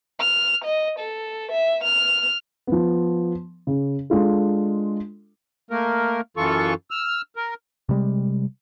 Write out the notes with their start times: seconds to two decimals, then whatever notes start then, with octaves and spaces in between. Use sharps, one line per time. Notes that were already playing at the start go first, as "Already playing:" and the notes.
0.20 F6
0.65 D#5
0.99 A4
1.52 E5
1.84 F6
2.67 F3 B3
3.67 C#3
4.10 G#3 D4 F4 A4
5.71 A3 A#3 A#4
6.37 F#2 E3 F4 A4 C#6
6.91 E6 F6
7.36 A#4
7.89 C3 G3 G#3